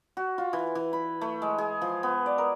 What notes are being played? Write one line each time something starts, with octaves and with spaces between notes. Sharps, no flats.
F#4
F4
E3
E3
B5
A3
G#3
G#4
F3
B3
D5
A#4